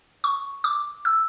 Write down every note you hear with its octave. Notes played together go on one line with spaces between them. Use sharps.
C#6
D6
E6